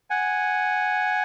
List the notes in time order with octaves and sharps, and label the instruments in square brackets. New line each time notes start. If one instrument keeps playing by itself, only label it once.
[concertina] F#5 G#5